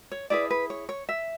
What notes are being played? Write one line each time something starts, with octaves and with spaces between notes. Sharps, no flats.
C#5
E4 G#4 B4 D5
B4
C#5
C#5
E5